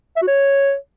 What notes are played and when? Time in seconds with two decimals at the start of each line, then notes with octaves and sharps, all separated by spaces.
0.16 E5
0.22 F#4
0.27 C#5